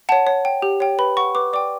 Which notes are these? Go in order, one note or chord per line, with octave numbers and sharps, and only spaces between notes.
C#5 F#5 A5
C#5
G5
G4
C#5 G5
B4 B5
F#5 C#6
B4 D6
D5 G5 D6